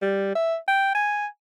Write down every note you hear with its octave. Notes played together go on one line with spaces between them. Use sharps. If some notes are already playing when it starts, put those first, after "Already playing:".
G3
E5
G5
G#5